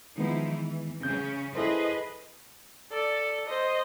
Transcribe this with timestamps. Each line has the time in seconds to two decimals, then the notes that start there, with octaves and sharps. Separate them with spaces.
0.18 D#3 F3 G#3 B3 D#4 E4
0.51 E3
1.03 C#3 C#4 G6
1.55 E4 G#4 A4 B4 C5 D#5
2.92 A4 D5
3.47 C5 D#5